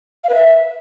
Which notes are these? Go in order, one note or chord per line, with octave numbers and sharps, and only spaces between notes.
F5
B4
E5